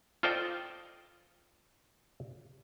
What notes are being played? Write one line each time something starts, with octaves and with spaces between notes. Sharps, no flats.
F4 A4 C5 D5 D#5 G5